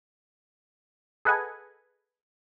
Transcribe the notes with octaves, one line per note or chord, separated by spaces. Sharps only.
G#4 A4 B4 D#5 F#5 G#5